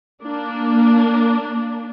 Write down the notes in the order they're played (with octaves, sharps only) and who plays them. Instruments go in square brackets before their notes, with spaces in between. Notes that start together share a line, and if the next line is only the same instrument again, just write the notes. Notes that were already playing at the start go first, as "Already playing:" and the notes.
[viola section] A#3 D4